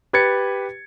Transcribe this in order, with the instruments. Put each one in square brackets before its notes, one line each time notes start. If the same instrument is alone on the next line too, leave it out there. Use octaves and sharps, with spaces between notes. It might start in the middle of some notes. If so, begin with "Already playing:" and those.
[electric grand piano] G4 B4 G#6 A6 C#7